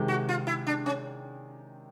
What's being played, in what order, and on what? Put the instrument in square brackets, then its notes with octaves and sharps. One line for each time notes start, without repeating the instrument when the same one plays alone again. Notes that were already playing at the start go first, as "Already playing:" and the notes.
Already playing: [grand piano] C3 D#3 G#3
[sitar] F#4
F4
E4
D4
C#4